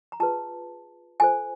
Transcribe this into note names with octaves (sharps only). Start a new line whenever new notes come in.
A#5
F4 G#4 B4 A5
F4 A4 C5 G#5